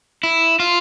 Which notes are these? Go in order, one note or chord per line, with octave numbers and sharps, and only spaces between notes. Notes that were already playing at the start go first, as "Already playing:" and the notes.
E4
F4